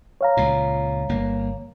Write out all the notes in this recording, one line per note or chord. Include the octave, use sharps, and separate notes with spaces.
C#5 F5 A#5
C#2 A#2
G1 A#3